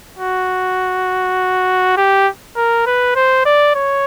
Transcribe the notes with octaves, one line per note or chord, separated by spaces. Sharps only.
F#4
G4
A#4
B4
C5
D5
C#5